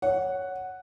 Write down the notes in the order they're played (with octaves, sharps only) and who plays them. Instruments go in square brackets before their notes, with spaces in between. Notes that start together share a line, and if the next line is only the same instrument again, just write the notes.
[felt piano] C#5 [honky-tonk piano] F#5